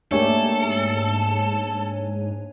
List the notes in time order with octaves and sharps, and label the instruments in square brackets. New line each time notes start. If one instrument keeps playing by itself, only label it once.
[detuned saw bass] G#2 [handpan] A3 A#3 G4 [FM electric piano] D4 C#5 G#5 [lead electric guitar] A4